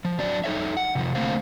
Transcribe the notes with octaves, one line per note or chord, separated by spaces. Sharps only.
F3
F#3 D4 D5
D#4 A4 C#5 E5
F#5
C3 D#3 F3
D3 A3 A#3 C4 C5 F5